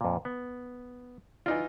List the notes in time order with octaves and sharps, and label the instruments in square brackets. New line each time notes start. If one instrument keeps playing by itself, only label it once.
[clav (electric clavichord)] F2 A#2
B3
[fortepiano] E3 D#4 F4 [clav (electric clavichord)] D5